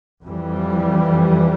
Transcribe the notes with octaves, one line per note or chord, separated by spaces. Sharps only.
F2 E3 G3